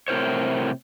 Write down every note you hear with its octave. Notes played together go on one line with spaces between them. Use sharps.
A2 C3 A#4 C5 C#5